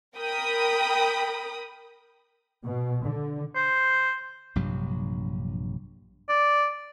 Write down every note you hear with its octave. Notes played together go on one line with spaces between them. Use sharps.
A#4 G5 B5 D#6
B2
D3
C5
A#1 G2 C3 F#3
D5